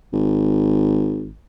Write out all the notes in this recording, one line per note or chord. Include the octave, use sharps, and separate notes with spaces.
G#1